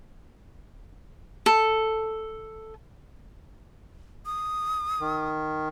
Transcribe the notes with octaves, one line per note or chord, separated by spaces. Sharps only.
A4
D#6
D#3